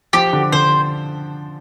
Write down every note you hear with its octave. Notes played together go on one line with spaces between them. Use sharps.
F3 G4
D3
D3 C5